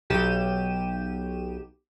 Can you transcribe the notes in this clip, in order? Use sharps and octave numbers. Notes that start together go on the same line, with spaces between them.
B1 G4 D#7 E7